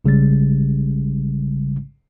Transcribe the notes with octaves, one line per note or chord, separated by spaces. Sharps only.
A1 C#3 G3 G#3 A6